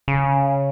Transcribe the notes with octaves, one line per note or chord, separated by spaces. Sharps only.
C#3